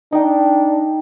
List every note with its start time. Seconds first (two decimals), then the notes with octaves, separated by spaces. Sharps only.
0.13 D4 D#4 G5